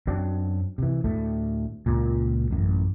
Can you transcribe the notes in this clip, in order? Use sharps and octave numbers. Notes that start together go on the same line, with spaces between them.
F#2 F#3 C4 D4
C3 E3
D2 A2 A3
C#2 A#2
A1 F#2